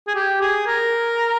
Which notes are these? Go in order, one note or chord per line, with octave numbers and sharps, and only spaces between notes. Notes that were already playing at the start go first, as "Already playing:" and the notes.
G#4
G4
G#4
A#4